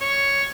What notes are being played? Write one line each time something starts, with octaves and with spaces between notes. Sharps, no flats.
C#5